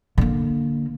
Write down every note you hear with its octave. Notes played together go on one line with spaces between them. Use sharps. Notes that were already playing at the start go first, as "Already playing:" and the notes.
D3 A#3